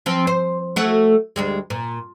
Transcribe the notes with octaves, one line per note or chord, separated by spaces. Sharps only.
F3 C4
C5
A3 E4 F#4
D2 G3 G#3
A#2